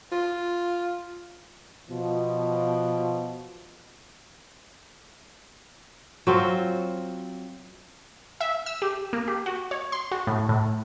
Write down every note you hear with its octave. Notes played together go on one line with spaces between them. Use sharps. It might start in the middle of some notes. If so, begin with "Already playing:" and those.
F4
B2 F3
F#3 C4 F4
E5
E6
G4
A#3
G4
F#4
C#5
C6
F#4
A2
A2